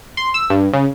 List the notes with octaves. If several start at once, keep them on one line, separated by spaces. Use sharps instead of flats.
C6
E6
G2
C#3